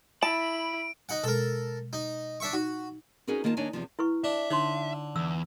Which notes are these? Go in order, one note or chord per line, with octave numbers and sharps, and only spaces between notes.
E4 A5 B5 D7
D#4 F#5
B2 G#3 A4 A#4
D#4
D4 E5 C#6
D#4 F#4
C#4 D#4 F#4 G#4 A#4 B4
D#3 A#3 F4 G#5 A5
D#2 D4 D#4 C#5 G#5
E2 C3 F3
E4 B4 C#6
D4 E5
D3 D#4 C#5 C6
E2 E6